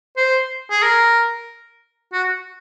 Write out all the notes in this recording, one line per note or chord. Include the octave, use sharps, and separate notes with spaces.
C5
G#4
A#4
F#4